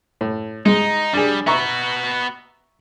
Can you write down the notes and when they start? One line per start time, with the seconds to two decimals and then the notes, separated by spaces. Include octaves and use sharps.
0.21 A2
0.66 G#3 D#4
1.13 G3 D4 G#4
1.47 B3 F#4 E5 A#5 C#6